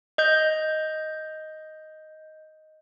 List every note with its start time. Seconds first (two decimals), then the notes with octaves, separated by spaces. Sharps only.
0.18 D#5 G6